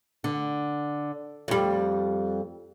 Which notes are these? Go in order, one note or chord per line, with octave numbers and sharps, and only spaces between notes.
D3
F2 G3